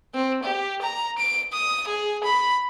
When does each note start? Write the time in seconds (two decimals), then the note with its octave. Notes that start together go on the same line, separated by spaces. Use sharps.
0.14 C4
0.43 G4
0.82 A#5
1.18 D7
1.53 D#6
1.88 G#4
2.24 B5